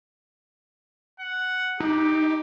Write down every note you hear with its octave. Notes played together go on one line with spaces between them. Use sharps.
F#5
D#4 G4